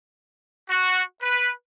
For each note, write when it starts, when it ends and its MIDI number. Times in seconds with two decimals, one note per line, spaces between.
0.69 1.01 66
1.21 1.51 71